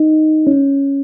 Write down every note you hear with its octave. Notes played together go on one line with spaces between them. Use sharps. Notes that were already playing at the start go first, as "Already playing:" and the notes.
Already playing: D#4
C#4